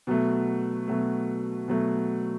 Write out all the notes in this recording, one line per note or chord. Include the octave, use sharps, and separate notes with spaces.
B2 F#3 A3
B2 F#3 A3
B2 F#3 A3